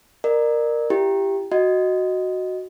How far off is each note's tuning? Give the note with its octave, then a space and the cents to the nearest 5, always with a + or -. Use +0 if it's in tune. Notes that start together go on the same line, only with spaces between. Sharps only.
A#4 +0 D5 +35
E4 +35 G4 +0
F#4 +0 D#5 +0